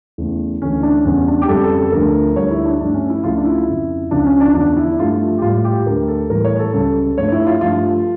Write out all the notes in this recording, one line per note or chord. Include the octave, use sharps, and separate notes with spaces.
E2 C#3 E3 A3
D2 C#3 E3 A3 C#4
D4
E2 C#3 G3 C#4
D4
G4
F2 C#3 G3 A4
A4
A4
D2 D3 F3 A3 A#4
D2 D3 G3 C#5
E4
D4
G2 F3 A3 D4
C#4
E4
C#2 C#3 F3 A3 F4
D4
E4
F2 C#3 F3
C#2 C#3 F3 D4
C#4
D4
E2 D3 F3 D4
E4
G2 F3 A3 F4
G4
A2 G3 F4
G4
D2 D3 A3 A#4
A4
A2 E3 G3 A#4
C#5
A4
C#2 C#3 G3 A4
G2 F3 A3 C#5
E4
F4
G2 F3 A3 F4